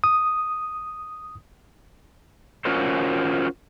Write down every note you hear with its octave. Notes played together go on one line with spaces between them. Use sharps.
D#6
C#4 F4 F#4 A#4 C5